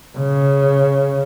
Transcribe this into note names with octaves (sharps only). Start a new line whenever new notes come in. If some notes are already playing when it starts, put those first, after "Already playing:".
C#3